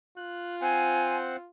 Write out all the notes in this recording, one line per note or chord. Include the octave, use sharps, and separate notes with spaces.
F4 F#6
C4 C5 F#5 G#5